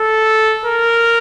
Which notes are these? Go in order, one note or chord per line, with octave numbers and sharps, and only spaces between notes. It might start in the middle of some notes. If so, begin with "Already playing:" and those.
Already playing: A4
A#4